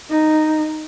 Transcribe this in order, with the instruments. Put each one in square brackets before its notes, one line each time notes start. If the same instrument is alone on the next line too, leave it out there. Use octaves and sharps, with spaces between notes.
[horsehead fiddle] D#4